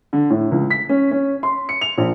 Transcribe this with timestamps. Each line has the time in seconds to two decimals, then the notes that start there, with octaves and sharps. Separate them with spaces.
0.13 D3
0.30 A2
0.51 C#2
0.70 B6
0.89 C#4
1.11 C#4
1.43 C6
1.69 C#7
1.81 F7
1.98 A#1